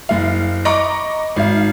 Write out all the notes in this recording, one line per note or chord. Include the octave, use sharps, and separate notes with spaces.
F#1 F5
D#5 A#5 B5 C#6 D6
G#1 F5